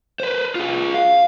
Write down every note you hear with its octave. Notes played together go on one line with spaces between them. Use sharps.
B4 C5
F4 G#4
F5